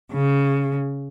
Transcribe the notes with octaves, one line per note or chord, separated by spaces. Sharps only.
C#3